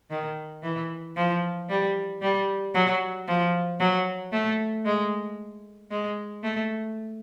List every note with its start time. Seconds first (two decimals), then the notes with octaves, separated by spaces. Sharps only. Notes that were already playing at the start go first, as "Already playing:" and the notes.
0.10 D#3
0.63 E3
1.16 F3
1.69 G3
2.22 G3
2.75 F#3
3.28 F3
3.80 F#3
4.32 A3
4.85 G#3
5.91 G#3
6.43 A3